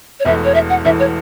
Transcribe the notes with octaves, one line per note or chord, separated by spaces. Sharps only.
C#5
E1 E2 E3 A3 E5
C#5
E5
F#5
E1 E2 E3 A3 E5
C#5